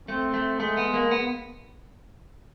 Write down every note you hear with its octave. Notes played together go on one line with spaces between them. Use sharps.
A3 C4
A3
G#3 A3
B3
A#3
B3